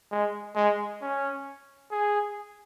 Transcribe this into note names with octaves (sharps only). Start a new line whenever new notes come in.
G#3
G#3
C#4
G#4